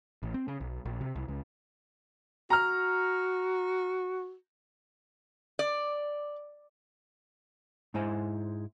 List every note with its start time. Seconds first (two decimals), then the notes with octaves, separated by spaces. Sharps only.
0.23 A1
0.34 C4
0.48 C#3
0.61 B1
0.85 A#1
1.01 C3
1.15 C2
1.28 C#2
2.50 F#4 A#5 F6
5.59 D5
7.94 G#2 G#3 E4 C5 G#5